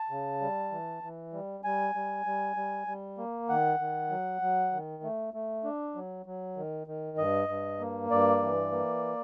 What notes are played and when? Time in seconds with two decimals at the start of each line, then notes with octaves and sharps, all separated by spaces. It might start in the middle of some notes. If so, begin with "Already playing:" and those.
Already playing: A5
0.10 C#3
0.41 G3
0.72 E3
1.03 E3
1.33 G3
1.64 G3 G#5
1.95 G3
2.26 G3
2.56 G3
2.87 G3
3.18 A#3
3.49 D#3 F#5
3.80 D#3
4.10 F#3
4.42 F#3
4.73 D#3
5.03 A3
5.34 A3
5.64 D4
5.95 F#3
6.26 F#3
6.57 D#3
6.87 D#3
7.18 G2 D#5
7.49 G2
7.80 A#3
8.11 G2 D5
8.42 E3
8.72 A#3